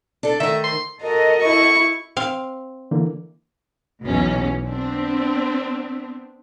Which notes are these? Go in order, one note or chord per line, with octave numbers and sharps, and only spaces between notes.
D4 A4
D#3 A3 E5
C6
F#4 A4 A#4 D#5
E4 C#6
C4 F5
D3 E3 A#3
B1 E2 B2 C#4
B3 C4 D4